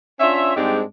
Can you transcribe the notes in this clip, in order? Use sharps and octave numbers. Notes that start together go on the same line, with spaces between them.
C#4 D4 F4 E5
G#2 G3 G#3 C4 D4 G4